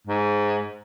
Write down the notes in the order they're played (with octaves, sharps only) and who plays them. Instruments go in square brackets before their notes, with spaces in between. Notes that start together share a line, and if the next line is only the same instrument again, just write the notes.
[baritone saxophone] G#2